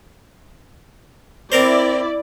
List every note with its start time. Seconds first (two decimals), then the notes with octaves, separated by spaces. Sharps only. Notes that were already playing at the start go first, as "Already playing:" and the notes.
1.52 C4 E4 A#4 C5 D5